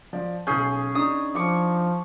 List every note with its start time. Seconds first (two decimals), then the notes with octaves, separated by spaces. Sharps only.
0.13 F3 D5
0.47 B1 C#4 G#4 G6
0.95 D4 D#4 D#6
1.35 F3 C#6 D6